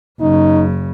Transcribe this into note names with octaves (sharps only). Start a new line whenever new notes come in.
F#1 C#3 D#4